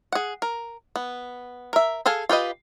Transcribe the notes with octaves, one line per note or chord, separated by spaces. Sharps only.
G#4 F#5
A#4
B3
A#4 E5
G#4 A4 F5 G#5
F4 G4 B4 D#5